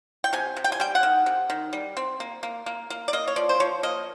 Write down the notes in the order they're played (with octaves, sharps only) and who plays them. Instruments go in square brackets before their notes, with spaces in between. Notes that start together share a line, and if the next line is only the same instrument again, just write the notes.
[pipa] G5
C3 G#5
C3
G5
G#5
G3 G5
F#5
D#3
C3
D#3
G3
C4
A#3
A#3
A#3
A#3
D5
A#3 D#5
C#5
F3 D5
C5
F3 C#5
A#3 D#5